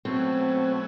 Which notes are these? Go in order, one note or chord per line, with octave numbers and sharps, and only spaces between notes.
B2 F#3 A3 C4 C#4